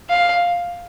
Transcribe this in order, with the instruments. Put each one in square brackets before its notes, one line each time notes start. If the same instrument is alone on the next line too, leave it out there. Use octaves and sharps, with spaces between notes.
[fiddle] F5